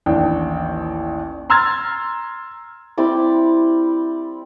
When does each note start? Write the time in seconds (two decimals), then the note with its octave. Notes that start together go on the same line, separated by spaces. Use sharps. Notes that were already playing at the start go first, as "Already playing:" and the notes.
0.06 A1 D#2 D4 G5
1.50 A#5 C6 E6 F6 G#6 A6
2.98 G3 C4 E4 D5